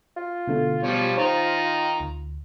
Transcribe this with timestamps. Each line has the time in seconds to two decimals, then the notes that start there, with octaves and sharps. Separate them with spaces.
0.17 F4
0.47 B2 D3 A3
0.83 B2 F3 G3 C#5
1.18 D#3 C5 A#5
2.00 D2